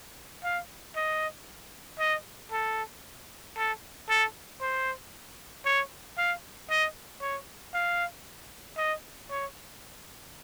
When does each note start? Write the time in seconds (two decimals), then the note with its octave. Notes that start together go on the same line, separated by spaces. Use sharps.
0.44 F5
0.96 D#5
1.99 D#5
2.52 A4
3.56 A4
4.09 A4
4.61 C5
5.65 C#5
6.18 F5
6.70 D#5
7.21 C#5
7.74 F5
8.77 D#5
9.30 C#5